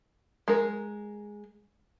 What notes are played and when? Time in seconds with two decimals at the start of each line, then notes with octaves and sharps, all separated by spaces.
0.48 G#3 A#4